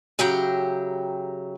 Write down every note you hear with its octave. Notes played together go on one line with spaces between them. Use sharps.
C#3 F#3 G4 E5 G5 A#5